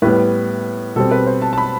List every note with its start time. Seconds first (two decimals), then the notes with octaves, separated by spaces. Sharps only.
0.02 A2 G3 B3 B4
0.96 B2 G3 C4 A4
1.11 B4
1.27 C5
1.42 A5
1.53 A5
1.58 B5